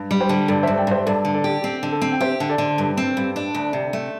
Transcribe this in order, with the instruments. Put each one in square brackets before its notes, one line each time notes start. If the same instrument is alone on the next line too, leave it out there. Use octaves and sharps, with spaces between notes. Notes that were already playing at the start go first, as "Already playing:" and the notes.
Already playing: [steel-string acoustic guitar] G2
G3
[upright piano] G4 C5
[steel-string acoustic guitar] D3
[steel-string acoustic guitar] G2 [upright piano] A4 D5
[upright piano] C5 E5
[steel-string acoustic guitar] G2
[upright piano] D5 G5
[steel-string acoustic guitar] G2 [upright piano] C5 E5
[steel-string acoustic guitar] G2 [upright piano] A4 D5
[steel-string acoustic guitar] D3
[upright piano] A4 D5
[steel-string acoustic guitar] G4
C4
D3
[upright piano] A4
[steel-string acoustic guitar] C4
[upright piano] G5
[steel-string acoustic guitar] G4 [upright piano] C5 E5
[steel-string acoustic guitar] D3
[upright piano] A4 D5
[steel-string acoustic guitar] D3
G2
C4
G2
D4
D2
C3
A3